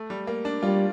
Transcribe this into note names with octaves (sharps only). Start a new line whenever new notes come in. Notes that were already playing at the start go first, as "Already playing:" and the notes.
Already playing: A3
G3
A#3
D4
G3 F4